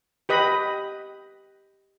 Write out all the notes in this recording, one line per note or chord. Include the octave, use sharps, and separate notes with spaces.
G4 B4 D#5 B5